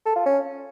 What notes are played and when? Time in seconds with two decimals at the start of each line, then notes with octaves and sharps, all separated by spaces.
0.06 A4
0.16 F4
0.26 C#4